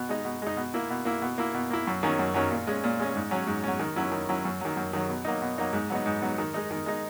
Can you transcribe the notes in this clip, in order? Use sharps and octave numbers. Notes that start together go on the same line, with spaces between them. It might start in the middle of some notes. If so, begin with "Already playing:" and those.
Already playing: B2
G#3 D#4
B2
G#3 D#4
B2
A#3 E4
B2
A#3 E4
B2
A#3 E4
B2
A#3 E4
F#2
D#3 F#3 C#4
F#2
D#3 F#3 C#4
A#2
G#3 C#4
A#2
G#3 C#4
G#2
F#3 C#4
G#2
F#3 C#4
D#3
F#3 C#4 E4
D#3
F#3 C#4 E4
F#2
D#3 F#3
F#2
D#3 F#3
B2
F#3 A#3 D#4
B2
F#3 A#3 D#4
G#2
F#3 B3 D#4
G#2
F#3 B3 D#4
D#3
G#3 D#4
D#3
G#3 D#4